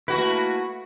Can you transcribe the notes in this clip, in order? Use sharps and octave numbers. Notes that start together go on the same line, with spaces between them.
A3 A#3 E4 F#4 B4